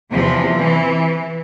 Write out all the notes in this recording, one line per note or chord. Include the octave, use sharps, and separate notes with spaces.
E2 C3 E3 F3
E3